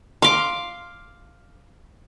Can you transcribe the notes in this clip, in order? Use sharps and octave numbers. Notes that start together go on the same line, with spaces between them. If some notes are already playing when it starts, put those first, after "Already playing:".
F5 C6 D6